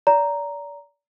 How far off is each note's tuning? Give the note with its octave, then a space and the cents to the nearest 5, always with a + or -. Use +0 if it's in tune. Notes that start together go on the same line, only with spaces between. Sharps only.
D5 -30 A#5 +0